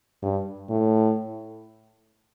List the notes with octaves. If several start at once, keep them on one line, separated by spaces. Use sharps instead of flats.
G2
A2